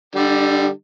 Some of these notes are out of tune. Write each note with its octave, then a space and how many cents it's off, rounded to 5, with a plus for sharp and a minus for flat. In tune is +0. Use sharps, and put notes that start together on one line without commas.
D3 +0 G3 +0 D#4 -45